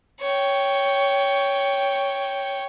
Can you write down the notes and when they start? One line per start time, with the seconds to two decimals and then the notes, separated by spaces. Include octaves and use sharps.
0.21 C#5 G5